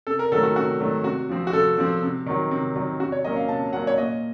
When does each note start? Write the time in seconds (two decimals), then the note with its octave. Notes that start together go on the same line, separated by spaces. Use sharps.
0.07 C3 A4
0.19 A#4
0.32 D#3 F#3 A3 A4
0.43 F#4
0.56 C3 F#4
0.80 D#3 F#3 A3
1.04 C3 F#4
1.29 F3 C4
1.47 F#4
1.53 C3 A4
1.78 F3 C4
2.03 C3
2.26 D#3 F#3
2.51 C3
2.76 D#3 F#3
3.00 C3 F#4
3.12 C#5
3.24 F#3 A#3 C#4 D#5
3.36 F5
3.48 C3 A5
3.73 F#3 A#3 C#4 F#5
3.87 C#5
3.97 A#2 D#5